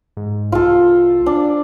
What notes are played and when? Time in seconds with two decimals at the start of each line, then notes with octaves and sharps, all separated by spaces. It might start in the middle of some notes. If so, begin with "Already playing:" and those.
0.17 G#2
0.52 C2 F4 A4
1.26 D4